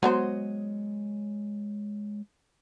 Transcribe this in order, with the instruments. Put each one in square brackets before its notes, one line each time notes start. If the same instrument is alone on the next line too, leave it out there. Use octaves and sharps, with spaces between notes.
[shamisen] F#3 B3 C5 [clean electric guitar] G#3 C#5 D#5